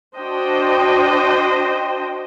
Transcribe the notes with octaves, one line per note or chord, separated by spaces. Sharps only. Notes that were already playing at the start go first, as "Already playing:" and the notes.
D4 F#4 C5 D#5 G5